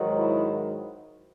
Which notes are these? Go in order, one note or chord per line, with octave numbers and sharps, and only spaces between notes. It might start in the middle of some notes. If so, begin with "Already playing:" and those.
Already playing: G#2 D#3 F#3
E4